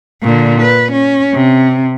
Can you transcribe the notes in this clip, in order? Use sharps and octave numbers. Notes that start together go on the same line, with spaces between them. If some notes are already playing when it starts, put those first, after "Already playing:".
A#2 D3
B4
C#4
C3